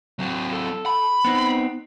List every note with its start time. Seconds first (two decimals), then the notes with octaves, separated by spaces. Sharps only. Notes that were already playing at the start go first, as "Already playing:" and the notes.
0.19 F#3 C4
0.52 A4
0.86 B5
1.25 B3 C4 D#4